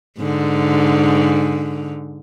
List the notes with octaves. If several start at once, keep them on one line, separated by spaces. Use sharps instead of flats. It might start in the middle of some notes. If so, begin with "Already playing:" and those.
G#2 D3